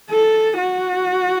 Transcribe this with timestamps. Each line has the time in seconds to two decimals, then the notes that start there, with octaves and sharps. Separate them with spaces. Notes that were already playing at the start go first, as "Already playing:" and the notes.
0.10 A4
0.57 F#4